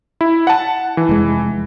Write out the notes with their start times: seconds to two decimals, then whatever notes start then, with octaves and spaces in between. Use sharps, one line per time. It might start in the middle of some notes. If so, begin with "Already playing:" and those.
0.21 E4
0.47 F#5 A5
0.97 E3
1.09 F1 G#3